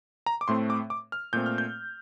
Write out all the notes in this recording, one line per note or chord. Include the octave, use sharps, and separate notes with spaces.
A#5
D6
A2 A3 C4 C6
D6
D6
F6
A#2 A3 C4 G6
F6
G6